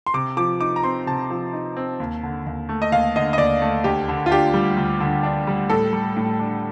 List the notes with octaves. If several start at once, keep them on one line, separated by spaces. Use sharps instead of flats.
C6
C3 D6
F3 D6
D#4 D6
A#5
C4 C6
C3 A5
F3
D#4
C4
D#2
D3
D#2
A3
D#5
D#2 F5
D3 D#5
D#5
D#2 D5
A3
D2 G4
D3
F4
D4 G4
G3
D2
D3
D4
G3
A2 A4
G3
A2
D4